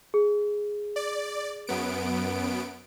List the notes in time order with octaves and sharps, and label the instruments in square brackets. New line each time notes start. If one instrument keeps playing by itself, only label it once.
[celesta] G#4
[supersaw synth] D5
F#2 B3 D7